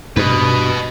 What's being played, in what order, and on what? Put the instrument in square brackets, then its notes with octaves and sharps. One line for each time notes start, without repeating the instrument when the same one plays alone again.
[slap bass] G2 B2 [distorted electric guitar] B4 D#5